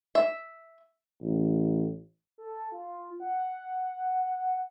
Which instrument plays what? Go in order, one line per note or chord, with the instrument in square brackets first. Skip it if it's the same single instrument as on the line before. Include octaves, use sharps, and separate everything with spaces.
[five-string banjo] E5
[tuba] A1
[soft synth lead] A4
F4
F#5